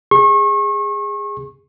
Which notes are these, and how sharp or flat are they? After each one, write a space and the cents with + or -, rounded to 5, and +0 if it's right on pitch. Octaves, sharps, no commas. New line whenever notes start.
G#4 -20 C#6 -35